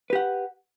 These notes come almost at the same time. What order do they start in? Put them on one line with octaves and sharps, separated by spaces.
B4 G4 F#5